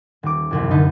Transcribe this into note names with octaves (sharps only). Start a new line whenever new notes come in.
D#1 D6
F#1 C2 F#2
F#1 D3 D#4 B4 A5